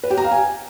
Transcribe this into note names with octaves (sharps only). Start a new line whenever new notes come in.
B4
G4
A#5
F5
G#5